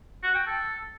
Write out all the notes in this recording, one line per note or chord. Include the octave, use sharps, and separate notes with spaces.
F#4
G5
A4